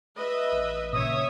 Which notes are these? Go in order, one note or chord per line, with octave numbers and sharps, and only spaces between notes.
B4 D#5 E5
A1
A#2 C#3 C#5 E5 D#6